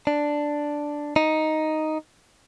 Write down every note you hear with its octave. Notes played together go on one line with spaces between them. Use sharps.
D4
D#4